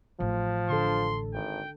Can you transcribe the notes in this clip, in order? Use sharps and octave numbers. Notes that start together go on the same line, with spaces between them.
A1 F3
D3 A4 C6
G#1 G5